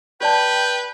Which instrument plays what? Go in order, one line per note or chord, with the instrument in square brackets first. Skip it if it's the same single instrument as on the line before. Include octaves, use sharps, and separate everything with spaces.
[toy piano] G4 D5 A5 [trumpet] B4 [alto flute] G5 [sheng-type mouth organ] G6